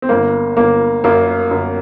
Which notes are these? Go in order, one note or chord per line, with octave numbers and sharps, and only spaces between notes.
C4
G1 A#3
G1 A#3
F#2 A#3
F#2